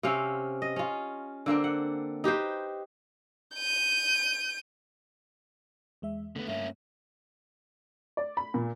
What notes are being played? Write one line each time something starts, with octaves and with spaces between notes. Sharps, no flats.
C3 C4 C#4 F5
D#5
C#4 F4
D3 A#3 C4 D4
F#5
D#4 G4 B4 C5
G6 D#7
E2 G#3 E5
D3 A3 B3
G2 A#3 C#4 E5
D5
B5
A#2